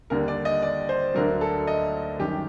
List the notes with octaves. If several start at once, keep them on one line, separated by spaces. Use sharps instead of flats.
D#2 D3 G3 A#4
D5
D#5
D5
C5
D2 D3 F#3 A#4
A4
D#5
F#2 D#3 G3 G4